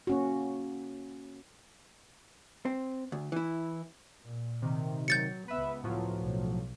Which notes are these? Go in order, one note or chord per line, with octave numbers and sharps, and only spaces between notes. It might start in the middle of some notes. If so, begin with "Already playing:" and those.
A#3 C#4 F#4
C4
D2
E3 E4
A#2
C3 D#3
F#3 G6 A6 C#7
C#2 B3 B4 E5
A2 F3 F#3
B1